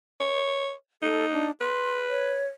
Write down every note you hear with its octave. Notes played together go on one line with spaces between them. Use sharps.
C#5
D#4 A4
D4
B4 C6
C#5